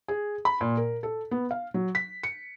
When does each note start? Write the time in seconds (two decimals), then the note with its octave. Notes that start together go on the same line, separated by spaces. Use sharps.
0.08 G#4
0.45 B5
0.61 A#2
0.77 A#4
1.03 A4
1.31 B3
1.51 F5
1.74 F#3
1.95 B6
2.23 C#7